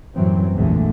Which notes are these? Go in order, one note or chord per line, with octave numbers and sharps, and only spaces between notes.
F#2 A2 E3 F#3 G3 C4
A#1 E2 A#2 D3 G#3 A3